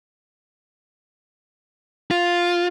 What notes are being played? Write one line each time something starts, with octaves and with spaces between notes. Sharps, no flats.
F4